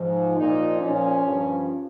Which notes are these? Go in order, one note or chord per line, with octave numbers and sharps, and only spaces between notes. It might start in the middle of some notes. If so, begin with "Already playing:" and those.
Already playing: G#2 F3
A#2 F3 D#4
A#2 F3 C#4
G2 F3